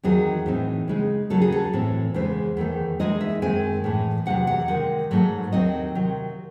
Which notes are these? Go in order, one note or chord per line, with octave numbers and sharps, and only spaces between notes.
E2 D#3 F#3 C4 D#4 G#4
A2 E3 C4 D#4
C#3 G#3 D#4
D#2 C#3 F#3 C#4 A4
G#4
A4
A2 E3 C4
E2 C#3 G#3 C5
E2 D#3 A3 D#4
E2 C#3 G#3 D#4 D#5
E5
F#2 D#3 G#3 C4 G#5
A2 E3 G#3
E2 C3 F#3 F#5
F#5
C3 D#3 G#3 F#5
G#2 F#3 A3 D#4
D#2 D#3 F#3 C4 D#4 D#5
C3 D#3 F#3